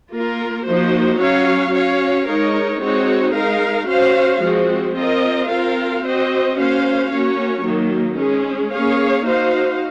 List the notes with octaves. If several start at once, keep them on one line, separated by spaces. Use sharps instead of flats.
A#3 F4 A#4
F3 A#3 D#4 F#4 C5
F#3 C#4 F#4 C#5 F5
C#4 F#4 C#5 F5
G#3 D#4 A#4 C#5
G#3 C4 D#4 F#4 C#5
G#3 D#4 A#4 F5
C#4 F#4 C5 F5
F3 G#3 C4 F#4
C4 F4 A#4 D#5
C4 F4 A#4 F5
C4 F#4 C5 D#5
A#3 C#4 F#4 C5 F5
A#3 C#4 F#4 C#5
D#3 F#3 A#3
G#3 C#4 G#4
A#3 C#4 G#4 C#5 F5
D#4 F#4 C5 F5